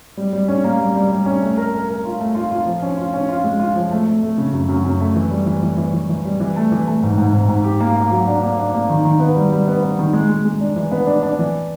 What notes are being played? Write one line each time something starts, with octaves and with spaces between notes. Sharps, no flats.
G3
G3
C#4
A#3
G3
G3
G3
C#4
A3
A#4
A#4
A#4
F4
A3
F4
F4
F3
C#4
F4
C#4
F4
G#3
F4
F3
A3
A3
A3
C#3
F#2
F#2
F#2
A3
E3
G3
E3
E3
E3
E3
E3
G3
E3
A3
E3
A3
G#2
G#2
G#2
G#2
G4
A#3
A#3
F#3
D4
A#3
D4
A#3
D#3
D#3
B3
G3
G3
B3
B3
D#3
G#3
G#3
G#3
D4
E3
B3
D4
D4
E3